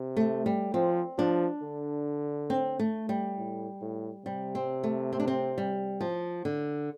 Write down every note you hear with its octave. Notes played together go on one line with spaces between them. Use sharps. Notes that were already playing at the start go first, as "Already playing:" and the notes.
Already playing: C3
A3
G3
F3 C4
F3 D4
D3
C4
A3
G3
A2
A2
C3 G3
C4
A3
C4
D4
C4
G3
F3
D3